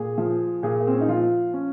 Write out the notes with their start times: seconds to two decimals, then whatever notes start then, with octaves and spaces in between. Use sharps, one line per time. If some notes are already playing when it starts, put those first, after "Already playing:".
Already playing: A#2 G#4
0.18 F3
0.63 A#2 G#4
0.80 A#3
0.87 C4
0.94 C#4
1.01 D#4
1.08 F3 F4
1.54 C#4